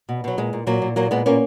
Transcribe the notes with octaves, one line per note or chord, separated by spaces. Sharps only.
B2
B2 F#3
A#2 G#3
A#2
A#2 F#3 A#3
A#2
A#2 F#3 A#3
A#2 G#3 B3
A#2 A#3 C#4